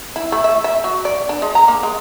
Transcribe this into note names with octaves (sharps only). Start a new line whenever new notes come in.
E4
A3
E5
E5
F#3
D5
D4
G#3
A#5
A#3
G#3